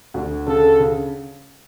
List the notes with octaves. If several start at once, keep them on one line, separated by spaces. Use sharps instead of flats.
D2
C#3 A4
C#3